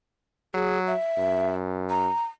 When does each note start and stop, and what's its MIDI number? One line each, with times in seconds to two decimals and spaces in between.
0.54 0.94 54
0.54 0.79 68
0.87 1.50 76
1.18 2.09 42
1.90 2.24 82